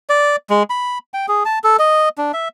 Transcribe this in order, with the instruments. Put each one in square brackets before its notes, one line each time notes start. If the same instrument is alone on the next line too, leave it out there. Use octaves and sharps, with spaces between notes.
[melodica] D5
G#3
B5
G5
G#4
A5
A4
D#5
D4
E5